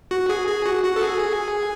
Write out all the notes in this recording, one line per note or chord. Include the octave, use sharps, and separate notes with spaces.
F#4
G#4
G#4
F#4
F#4
A4
G#4